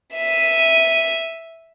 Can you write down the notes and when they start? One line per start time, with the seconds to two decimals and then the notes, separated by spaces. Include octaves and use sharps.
0.15 E5 D#7